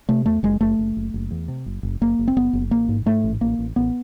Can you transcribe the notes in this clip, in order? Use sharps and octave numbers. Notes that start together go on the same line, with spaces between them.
C3 A3
E2 A3
F#1 G#3
F#1 A3
F#1
F#1
F#1
E2
C3
F#1
F#1
F#1 A#3
F#1
C4
F#1 B3
F#1
A1 A#3
G#2
G#2 A3
A1
A1 A#3
A1
A1 B3